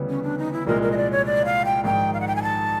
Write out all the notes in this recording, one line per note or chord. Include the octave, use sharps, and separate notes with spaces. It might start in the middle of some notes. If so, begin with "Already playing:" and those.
Already playing: D2 C#3 E3 G3 B3
C#4
D4
D#4
E4
C2 A#2 F3 G#3 A#4
A#4
D#5
D5
C#5
D5
F5
G5
A#1 G#2 D#3 G5
F5
F#5
G5
G#5
A5